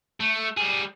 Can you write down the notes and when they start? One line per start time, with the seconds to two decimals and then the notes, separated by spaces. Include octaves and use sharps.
0.20 A3
0.57 G3 G#4